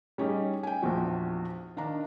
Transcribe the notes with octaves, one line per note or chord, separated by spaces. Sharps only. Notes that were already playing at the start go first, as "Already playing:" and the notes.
G3 C#4 D#4 G#4
G5 G#5
A#1 E2 F3 F#4
D#3 D4 F5 A#5